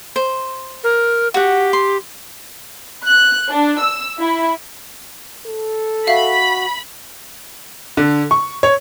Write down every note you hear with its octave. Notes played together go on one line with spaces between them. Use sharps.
C5
A#4
F#4 G4 F#5
C6
F#6
D4
E6
E4
A4
F#4 E5 F5 B5
D3
C#6
C#5